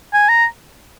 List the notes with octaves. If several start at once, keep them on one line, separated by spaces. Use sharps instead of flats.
G#5
A#5